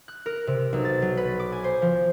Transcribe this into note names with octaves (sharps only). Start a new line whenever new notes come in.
F#6
A#4
C3
B1
A6
F#3
B4
D6
G#5
C5
F3